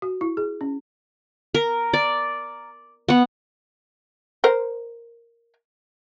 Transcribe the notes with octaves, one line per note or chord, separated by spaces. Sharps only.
F#4
E4
G#4
C#4
A#4
D5
B3 F#5
A#4 C5